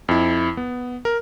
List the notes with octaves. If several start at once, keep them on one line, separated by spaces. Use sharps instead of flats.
F2 E4
B3
A#4